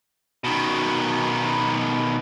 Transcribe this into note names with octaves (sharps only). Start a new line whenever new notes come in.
B2 D#3